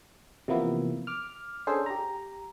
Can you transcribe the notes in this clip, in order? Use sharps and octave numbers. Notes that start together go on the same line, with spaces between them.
C3 E3 F3 A#3 B3 E4
D6 F6
C#4 D4 G#4 A4 C5
G4 A#5